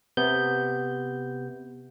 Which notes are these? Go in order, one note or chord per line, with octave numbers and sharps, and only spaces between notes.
C3 B3 G6